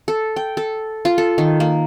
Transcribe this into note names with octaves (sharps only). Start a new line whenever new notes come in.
A4
G5
A4
F4
A4
D#3
A#3